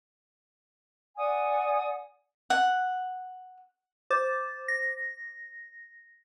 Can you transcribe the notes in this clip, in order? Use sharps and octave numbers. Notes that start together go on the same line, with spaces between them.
D5 F#5 G#5 D#6
F#5
C5 D6 A6
A#6